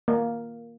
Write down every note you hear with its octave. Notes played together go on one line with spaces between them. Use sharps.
A#3